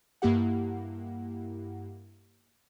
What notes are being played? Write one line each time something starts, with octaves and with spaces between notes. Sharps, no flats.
G2 A#3 E4 G4 F#5